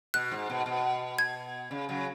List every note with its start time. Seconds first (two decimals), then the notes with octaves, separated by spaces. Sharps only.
0.14 B2 F#6
0.31 G#2
0.50 B2
0.66 B2
1.19 G#6
1.71 C#3
1.89 C#3 F#3